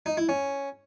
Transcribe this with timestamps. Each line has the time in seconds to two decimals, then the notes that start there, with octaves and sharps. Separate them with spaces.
0.06 D#4
0.17 E4
0.29 C#4